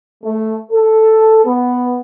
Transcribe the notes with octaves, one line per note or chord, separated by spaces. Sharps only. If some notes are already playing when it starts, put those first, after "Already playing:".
A3
A4
B3